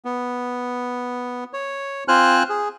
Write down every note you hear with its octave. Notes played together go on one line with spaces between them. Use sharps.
B3
C#5
C4 F4 C5 G#5 F6 F#6
G#4